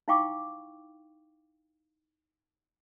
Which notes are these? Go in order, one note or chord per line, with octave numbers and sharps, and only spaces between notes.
D#4 E4 F5 G5 C#6 D6